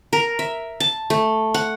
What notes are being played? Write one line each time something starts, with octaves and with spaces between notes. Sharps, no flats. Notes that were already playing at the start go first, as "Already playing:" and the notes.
A#4
E5
A5
A3
F#5